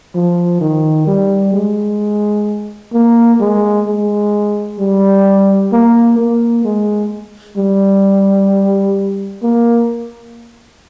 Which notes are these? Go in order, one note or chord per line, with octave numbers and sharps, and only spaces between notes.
F3
D#3
G3
G#3
A#3
G#3
G#3
G3
A#3
A#3
G#3
G3
A#3